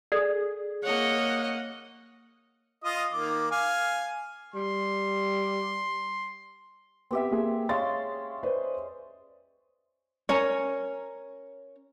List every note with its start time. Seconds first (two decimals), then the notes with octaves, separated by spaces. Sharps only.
0.12 G#4 A4 D5
0.83 A#3 C#5 D#5 F#5
2.84 F4 D#5 D#6
3.13 D#3 A#3 D6
3.51 F5 G#5
4.54 G3 C6
7.11 B3 C4 G4 E5
7.31 A#3 G#4
7.69 G#3 C#4 F5 C6 A6
8.43 B4 C5 D5
10.29 C#4 A#4 C#5